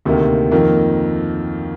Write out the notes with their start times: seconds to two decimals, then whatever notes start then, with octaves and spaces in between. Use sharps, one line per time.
0.05 D2 C3 D#3 A#3
0.51 F2 D#3 A#3